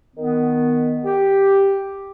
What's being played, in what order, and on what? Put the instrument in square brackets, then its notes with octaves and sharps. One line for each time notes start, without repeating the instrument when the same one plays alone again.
[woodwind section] D#3 B3
G4